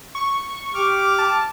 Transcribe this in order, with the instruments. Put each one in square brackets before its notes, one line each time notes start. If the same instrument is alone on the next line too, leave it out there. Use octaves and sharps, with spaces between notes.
[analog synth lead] C#6
[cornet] G4 [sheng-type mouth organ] D6 F6
[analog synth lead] A5